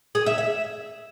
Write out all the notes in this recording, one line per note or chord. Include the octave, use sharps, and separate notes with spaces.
G#4
E5
E5